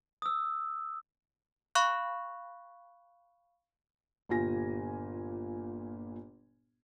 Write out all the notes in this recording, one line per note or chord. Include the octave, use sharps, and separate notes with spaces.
D#6 E6
F5 B5 C#6 F#6
G1 A#2 F4 G4 G#5 A#6